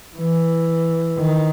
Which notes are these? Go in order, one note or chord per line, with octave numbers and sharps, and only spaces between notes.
E3
D#3